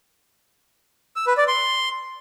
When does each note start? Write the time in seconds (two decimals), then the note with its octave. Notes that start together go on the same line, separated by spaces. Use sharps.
1.16 E6
1.27 B4
1.37 D5
1.48 C6